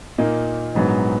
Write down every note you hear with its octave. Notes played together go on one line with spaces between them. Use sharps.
A#2 A#3 D#4
A#1 G#2 F#3 B3